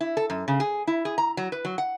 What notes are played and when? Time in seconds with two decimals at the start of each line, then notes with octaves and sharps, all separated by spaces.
0.01 E4
0.17 A4
0.30 F#2
0.48 C#3
0.60 G#4
0.87 E4
1.05 G#4
1.18 A#5
1.37 F#3
1.52 B4
1.65 F#3
1.78 F#5